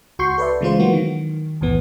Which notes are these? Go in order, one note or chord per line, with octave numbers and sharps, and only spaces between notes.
C#2 F#4 C6 C#6 G6 C7
A4 B4 D5 E5
C#3 E3 G#3 A3 F4 C5
E3 F#3 A#3 B3 F#4
D#3
B1 E2 A2 E3 B3